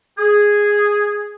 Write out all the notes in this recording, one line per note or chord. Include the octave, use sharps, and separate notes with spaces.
G#4